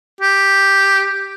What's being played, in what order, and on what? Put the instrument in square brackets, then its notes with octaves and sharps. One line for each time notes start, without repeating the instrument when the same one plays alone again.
[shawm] G4